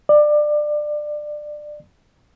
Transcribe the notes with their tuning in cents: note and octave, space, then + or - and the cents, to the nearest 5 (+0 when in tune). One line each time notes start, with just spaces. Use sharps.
D5 +25